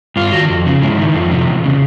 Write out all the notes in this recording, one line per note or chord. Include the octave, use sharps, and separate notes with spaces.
G2 F4
D#3 F#4
F2
C#3
G#2 E4
D#3
F2
C3
E2
C#3